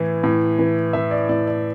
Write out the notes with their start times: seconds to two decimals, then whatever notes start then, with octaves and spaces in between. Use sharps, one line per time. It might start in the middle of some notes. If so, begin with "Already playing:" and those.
Already playing: A2 E3
0.23 A2
0.59 E3
0.93 E3 E5
1.11 D5
1.29 A2 D5
1.47 D5